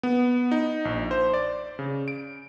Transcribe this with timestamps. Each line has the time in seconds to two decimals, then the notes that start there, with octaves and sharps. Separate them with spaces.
0.03 B3
0.52 D#4
0.85 A#1
1.11 C5
1.34 D5
1.79 C#3
2.08 D7